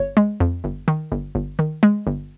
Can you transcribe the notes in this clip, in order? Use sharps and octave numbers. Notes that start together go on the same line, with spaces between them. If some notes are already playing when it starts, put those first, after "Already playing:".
Already playing: G1 C#5
G#3
F2
G1
D#3
G1
G1
D#3
G#3
G1